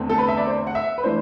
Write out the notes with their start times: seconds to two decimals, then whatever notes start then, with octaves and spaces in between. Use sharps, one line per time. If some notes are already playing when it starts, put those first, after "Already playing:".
Already playing: E2 D3 A3 C4
0.09 A4
0.18 B4
0.28 E5
0.38 D5
0.47 C5
0.67 F#5
0.75 E5
0.98 B4
1.04 E3 A3 D4 C5